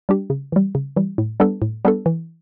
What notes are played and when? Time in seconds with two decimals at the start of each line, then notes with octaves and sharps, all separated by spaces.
0.09 G3 D4 G4
0.30 C#3
0.52 E3 G3
0.75 C#3
0.96 E3 G3
1.18 A2
1.40 G3 B3 D4 A4
1.62 A2
1.85 G3 B3 D4 A4
2.06 E3